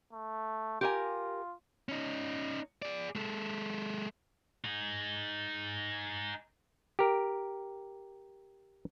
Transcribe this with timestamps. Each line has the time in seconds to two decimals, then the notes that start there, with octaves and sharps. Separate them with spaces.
0.13 A3
0.81 F4 G4 A#4 G#5
1.89 C#4 D#4
2.82 G#4 D5
3.15 G#3 A4
4.65 D#4 G#4
6.99 G4 A#4